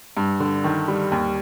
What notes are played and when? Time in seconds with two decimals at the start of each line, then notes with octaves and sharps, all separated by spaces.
0.17 G2
0.40 D3
0.64 D#3
0.88 G3
1.12 D#2